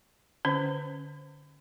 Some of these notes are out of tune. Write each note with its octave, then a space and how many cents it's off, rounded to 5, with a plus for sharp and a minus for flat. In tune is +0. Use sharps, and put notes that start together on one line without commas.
D3 +0 C#4 +10 C5 +0